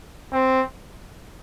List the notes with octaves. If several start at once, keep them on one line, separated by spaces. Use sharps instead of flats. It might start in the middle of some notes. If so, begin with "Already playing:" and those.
C4